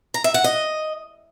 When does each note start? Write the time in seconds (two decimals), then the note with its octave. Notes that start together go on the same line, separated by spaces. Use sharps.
0.14 A#5
0.24 E5
0.34 F#5
0.44 D#5